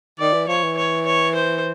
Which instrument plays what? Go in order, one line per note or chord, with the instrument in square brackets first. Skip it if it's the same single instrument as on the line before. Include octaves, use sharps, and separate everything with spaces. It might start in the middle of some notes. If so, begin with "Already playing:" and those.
[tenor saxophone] D#3 [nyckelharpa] D5
[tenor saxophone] E3
[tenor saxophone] F3 [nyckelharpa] C#5
[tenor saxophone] E3
[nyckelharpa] C#5
C#5
C5